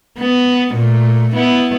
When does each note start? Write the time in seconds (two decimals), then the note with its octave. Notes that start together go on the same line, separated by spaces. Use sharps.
0.19 B3
0.75 A#2 A3
1.35 B3 E4